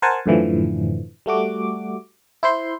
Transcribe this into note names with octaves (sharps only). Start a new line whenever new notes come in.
A#4 C5 F#5 G#5 A5
F#2 A2 D3 E3 F3
G3 A3 F#4 D6
E4 C5 C6